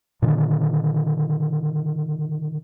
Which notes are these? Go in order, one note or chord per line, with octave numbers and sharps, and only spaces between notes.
A#2 D3 D#3